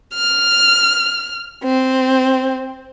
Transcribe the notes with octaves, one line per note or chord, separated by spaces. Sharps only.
F6
C4